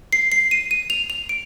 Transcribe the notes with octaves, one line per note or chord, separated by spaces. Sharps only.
C7
C7
D#7
D#7
F7
F7
D7